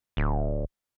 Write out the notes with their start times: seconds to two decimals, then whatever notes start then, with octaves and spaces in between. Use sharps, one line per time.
0.17 D1